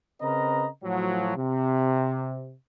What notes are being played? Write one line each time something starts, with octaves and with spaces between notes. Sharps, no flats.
C#3 C4 A#4 B4 D#5 A#5
A2 F3 F#3
C3